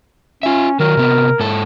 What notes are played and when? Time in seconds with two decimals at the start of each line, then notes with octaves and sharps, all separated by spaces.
0.43 C#4 F4 E5
0.80 D#3 F#3 A#4
0.97 C3 B3
1.40 G#2 A4